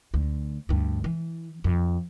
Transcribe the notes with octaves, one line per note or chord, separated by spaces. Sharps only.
D2
D2 G2
E3
F2